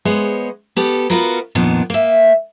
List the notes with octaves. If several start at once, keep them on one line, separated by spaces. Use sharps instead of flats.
G#3 B3 C5 C#5
B3 G4 A4
B3 F4 F#4 A#4 B4
F2 A#2 D#3 B3 D4
A#3 E5